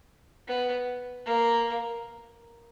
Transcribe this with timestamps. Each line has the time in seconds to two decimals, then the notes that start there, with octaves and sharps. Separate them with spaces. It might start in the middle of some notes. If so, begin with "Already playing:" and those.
0.48 B3
1.25 A#3